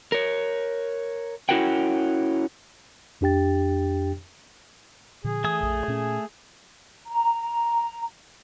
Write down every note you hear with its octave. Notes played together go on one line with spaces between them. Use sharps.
A#4 C#5
C#4 E4 F#4 A#4 F#5 G5
F2 D4 G4 G5 A6
A#2 D3 F3 G#4
E3 A3 G#5 D#6
A#1 F2 A#2
A#2 C#4
A#5